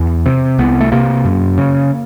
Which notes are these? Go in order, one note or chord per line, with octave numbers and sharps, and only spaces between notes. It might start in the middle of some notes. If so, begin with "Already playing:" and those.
Already playing: E2
C3
C2 B3
A3
C3 A#3
F#2
C#3